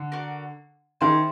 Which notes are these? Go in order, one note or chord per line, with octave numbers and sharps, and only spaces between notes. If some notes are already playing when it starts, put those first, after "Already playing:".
Already playing: D3
F#4 A#4 D5
D#3 E4 G#4 C5